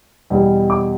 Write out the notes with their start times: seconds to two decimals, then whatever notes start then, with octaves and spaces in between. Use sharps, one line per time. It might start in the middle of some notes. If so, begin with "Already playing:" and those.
0.30 E2 B2 G3
0.70 D6